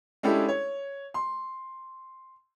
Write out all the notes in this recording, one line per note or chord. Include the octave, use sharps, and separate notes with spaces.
G#3 C#4 D4 E4 G4 A4
C#5
C6